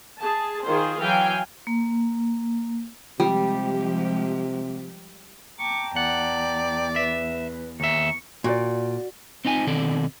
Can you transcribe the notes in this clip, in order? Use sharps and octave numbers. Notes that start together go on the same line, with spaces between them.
G#4 A5
D#3 F4 G#4 C5
E3 F#3 F5 G5 G#5
A#3
C3 F3 G3 G#3 G4
G5 A5 A#5 C#6 D6
E2 D5 F#5
B4 E5
D#2 E5 G#5 A#5 C#6
A#2 F#4 D5
C4 D#4 F4 G#5
B2 D#3 C4 A4 D5